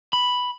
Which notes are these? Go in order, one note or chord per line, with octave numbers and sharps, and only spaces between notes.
B5